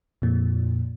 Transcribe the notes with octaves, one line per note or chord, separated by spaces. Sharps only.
F2 A#2